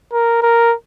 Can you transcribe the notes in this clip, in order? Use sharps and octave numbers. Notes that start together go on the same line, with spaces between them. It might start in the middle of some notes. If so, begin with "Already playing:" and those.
A#4
A#4